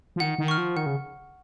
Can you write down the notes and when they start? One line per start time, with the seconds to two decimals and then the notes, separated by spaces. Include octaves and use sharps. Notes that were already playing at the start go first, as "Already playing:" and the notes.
0.16 F3
0.20 D#3 F#5
0.39 D#3
0.48 C#6 F6
0.58 F3
0.76 D#3 F#5
0.86 C#3